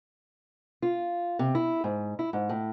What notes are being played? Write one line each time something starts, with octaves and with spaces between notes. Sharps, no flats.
F4
C3
E4
G#2
E4
G#2
A2